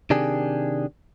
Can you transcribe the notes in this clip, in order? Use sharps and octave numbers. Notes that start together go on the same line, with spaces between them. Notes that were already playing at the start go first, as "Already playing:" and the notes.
C3 D#3 D4 G4 G#4